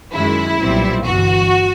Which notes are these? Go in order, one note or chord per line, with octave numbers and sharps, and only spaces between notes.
F#2 D#3 G#3 E4
B1 A#2 G3 C4
G1 G2 E3 F#4